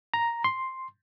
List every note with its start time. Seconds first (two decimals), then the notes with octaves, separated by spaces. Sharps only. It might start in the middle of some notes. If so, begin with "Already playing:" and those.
0.14 A#5
0.44 C6